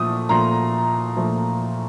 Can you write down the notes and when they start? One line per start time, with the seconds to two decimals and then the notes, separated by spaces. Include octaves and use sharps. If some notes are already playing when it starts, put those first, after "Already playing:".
Already playing: A#2 F3 A3 D#6
0.29 A#2 F3 A3 A#5 C6
1.16 A#2 F3 A3